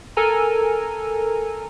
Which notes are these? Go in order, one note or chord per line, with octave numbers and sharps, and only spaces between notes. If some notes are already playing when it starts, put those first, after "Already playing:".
A4 A#4 G#5 A#5